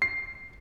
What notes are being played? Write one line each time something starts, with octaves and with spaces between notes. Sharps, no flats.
C7